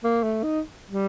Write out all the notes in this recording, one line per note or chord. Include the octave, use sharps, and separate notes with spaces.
A#3
A3
D#4
G3